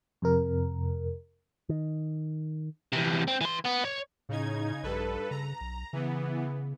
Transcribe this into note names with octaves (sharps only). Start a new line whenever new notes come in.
F2 C3 A#4
D#3
E2 C3
C4
E3 C6
B3
C#5
A2 C#3 D#4 G#6
A#1 G2 A4 B4
C#3 A#5
B1
C#3 E3 B3